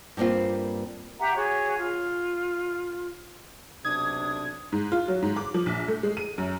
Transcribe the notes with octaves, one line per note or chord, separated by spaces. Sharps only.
G2 G3 A#3 C4 F4
G4 E5 F#5 A#5
F#4 G#4 C#5
F4
B1 C3 D4 D#6 G#6
G#2
F4
F#3
G#2
D6
F3
A#1
A3
G#3
D#7
F#2